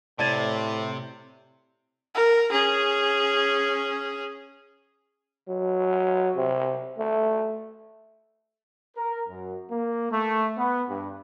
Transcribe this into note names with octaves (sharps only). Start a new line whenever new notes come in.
A2 C3 D5 A5 G#6 A6 D#7
A#4
C#4 G#4
F#3
C3
A3
A#4
F#2
A#3
A3
B3
G2